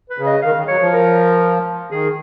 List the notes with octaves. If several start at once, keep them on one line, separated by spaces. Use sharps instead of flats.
B4
C#3
D#5
D#3 F5
D#3
F#3 C#5
F3
A#4
D#3 G#4